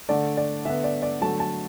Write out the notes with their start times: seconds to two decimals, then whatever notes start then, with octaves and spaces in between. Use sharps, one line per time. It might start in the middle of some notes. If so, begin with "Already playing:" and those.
0.09 D3 A3 D5
0.37 D5
0.65 D3 B3 E5
0.84 D5
1.02 D5
1.21 D3 F#3 A3 A5
1.40 A5